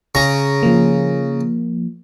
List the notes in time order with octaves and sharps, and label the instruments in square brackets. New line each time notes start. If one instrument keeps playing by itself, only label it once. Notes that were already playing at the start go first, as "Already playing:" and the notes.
[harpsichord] C#3 A#5 C#6
[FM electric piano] F3 A#3